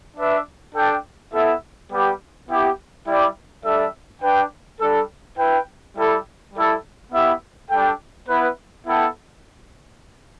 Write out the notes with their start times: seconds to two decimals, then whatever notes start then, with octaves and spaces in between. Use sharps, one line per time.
0.17 D4 B4 E5
0.75 D4 A4 G5
1.32 B3 E4 A4 E5
1.91 G3 B3 G4
2.48 B3 E4 G4
3.06 G3 E4 G4 D5 G5
3.64 G3 D4 A4 E5
4.22 D4 B4 G5
4.80 G3 D4 A4
5.37 E4 B4 G5
5.96 G3 E4 A4
6.54 G3 E4 A4
7.12 B3 E4 G4 E5
7.70 G3 D4 A4 G5
8.28 B3 E4 B4
8.85 B3 E4 A4 G5